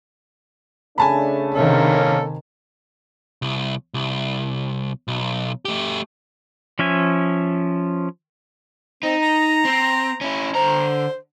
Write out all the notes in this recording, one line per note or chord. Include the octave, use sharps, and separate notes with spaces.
C#3 A3 D4 G#5 A5 B5
C3 D#3 A#3 C#4 A4
C2
C2
B1
A3 G4
F3 C#4 E5 G#5
C4 D#4
A#5
C4
C#4 E4
D3 C5 A#5